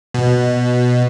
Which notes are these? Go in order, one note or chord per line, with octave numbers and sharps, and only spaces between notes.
B2